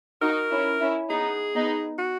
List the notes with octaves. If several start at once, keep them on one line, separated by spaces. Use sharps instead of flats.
D#4 F#4 A#4
C#4 E4
C#4 E4
B3 D#4 G#4
B3 D#4
F#4